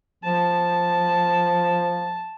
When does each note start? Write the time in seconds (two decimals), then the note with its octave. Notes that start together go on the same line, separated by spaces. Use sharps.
0.24 F3 A5